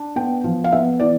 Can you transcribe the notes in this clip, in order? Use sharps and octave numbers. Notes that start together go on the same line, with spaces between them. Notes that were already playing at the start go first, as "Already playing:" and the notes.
Already playing: D4
B3 G5
F3
F5
B3 E5
E3 D5